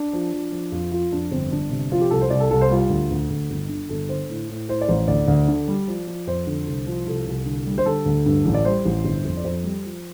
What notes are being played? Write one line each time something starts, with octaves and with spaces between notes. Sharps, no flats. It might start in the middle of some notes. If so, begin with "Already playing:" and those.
Already playing: D4
F3
F3
F3
F2 F4
F3 F4
F2 D4
G1 C4
G1 D4
C3
F3 F4
G4
C2 A4
C5
C2 D5
A4
C2 A4
C5
G3 F4
D2
D2
D2
G1
D3
G1 A4
D3 C5
A2
A2
A2 C5
D5
A1 C5
D2 D5
D2
D3
G3
F3
F3
F2 C5
D3
C2
F3
C2 A4
C2
D3
G3
C5
D3 A4
D2
G2
A1
D5
G3 C5
A1
G1
F2
D5
F2 C5
G3
F3